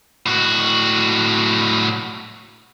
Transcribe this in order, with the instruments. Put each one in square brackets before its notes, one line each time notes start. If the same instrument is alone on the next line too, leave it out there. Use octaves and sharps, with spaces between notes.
[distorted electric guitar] A2 F#4